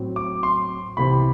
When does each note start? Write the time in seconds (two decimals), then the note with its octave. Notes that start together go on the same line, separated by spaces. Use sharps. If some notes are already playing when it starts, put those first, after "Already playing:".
Already playing: A2 F#3 C4 E4
0.16 D6
0.43 C6
0.97 C2 C3 E3 B5